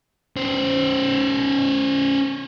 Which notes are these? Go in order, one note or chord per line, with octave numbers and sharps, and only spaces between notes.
C#4 C5